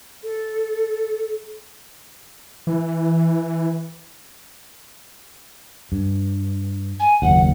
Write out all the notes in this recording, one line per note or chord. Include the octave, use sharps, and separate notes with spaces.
A4
E3
G2
G#5
F#1 D#2 F#5